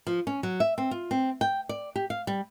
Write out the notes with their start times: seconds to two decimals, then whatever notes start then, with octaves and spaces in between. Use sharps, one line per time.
0.07 F3
0.27 C#4
0.43 F#3
0.60 E5
0.78 C4
0.91 F4
1.11 C4
1.41 G5
1.69 D5
1.96 G4
2.10 F5
2.27 G3